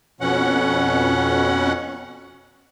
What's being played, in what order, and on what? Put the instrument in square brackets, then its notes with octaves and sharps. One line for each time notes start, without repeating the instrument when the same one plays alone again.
[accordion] F2 B2 C#4 F#5